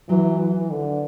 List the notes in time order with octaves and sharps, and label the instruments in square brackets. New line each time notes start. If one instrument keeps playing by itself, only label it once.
[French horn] E3 [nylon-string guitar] F#3
[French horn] E3
D3